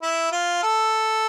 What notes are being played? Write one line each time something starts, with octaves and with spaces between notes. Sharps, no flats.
E4
F4
A4